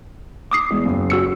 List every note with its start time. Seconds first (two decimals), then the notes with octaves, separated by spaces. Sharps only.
0.51 D6 D#6 C7
0.70 E2 G#3
0.85 F#1
1.10 F#4 E6 C#7